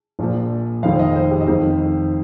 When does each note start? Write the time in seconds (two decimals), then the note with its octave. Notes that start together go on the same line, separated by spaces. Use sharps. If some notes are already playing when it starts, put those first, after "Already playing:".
0.19 A#1 A#2 F3
0.83 F1 F2 D#3 F5
0.92 C5
0.99 D#5
1.16 C5
1.31 G4
1.41 D#5
1.47 F1 F2 D#3 C5